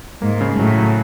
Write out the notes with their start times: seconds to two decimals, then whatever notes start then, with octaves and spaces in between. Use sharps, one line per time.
0.22 G#2 A#3
0.41 C#3
0.59 A2 F#3
0.77 F#3